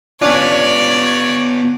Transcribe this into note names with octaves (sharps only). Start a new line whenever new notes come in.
B3 C#4 D4 F4 C#5 D5